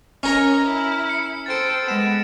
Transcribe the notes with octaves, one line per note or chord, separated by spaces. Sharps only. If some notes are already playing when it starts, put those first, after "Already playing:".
C#4 A#4 C#5 D#5 A#5 F6
E4
C#7
A4 C5 G5 A6 D7
G#3 B3 D7 E7